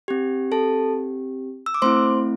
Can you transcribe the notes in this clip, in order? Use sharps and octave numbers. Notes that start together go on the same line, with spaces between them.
C4 G4
A4 A5
E6
D6
A3 C4 E4 C5 C6